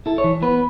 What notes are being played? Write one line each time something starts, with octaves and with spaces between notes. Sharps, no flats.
E4 A4
C#5
E3
B3 B4